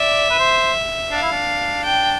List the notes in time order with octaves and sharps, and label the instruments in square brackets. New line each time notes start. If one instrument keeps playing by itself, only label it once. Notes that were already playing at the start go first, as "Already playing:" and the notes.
Already playing: [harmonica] D5 [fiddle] E5
[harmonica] B4
C5
[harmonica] D4 [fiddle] F5
[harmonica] E4
D4
[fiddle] G5